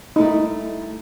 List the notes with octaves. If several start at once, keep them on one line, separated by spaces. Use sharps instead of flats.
G3 A3 D#4 E4